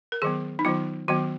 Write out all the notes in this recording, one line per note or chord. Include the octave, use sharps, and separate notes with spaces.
A#4
D#3 F#3 B3 G#4
D#4
D#3 F#3 B3 F4
D#3 F#3 B3 F#4